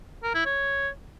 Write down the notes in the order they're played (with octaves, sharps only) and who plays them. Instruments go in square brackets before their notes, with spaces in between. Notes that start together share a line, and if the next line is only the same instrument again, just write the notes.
[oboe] A#4
E4
C#5